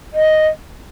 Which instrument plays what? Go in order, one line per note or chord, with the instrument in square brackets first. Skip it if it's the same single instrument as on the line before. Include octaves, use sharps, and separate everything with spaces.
[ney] D#5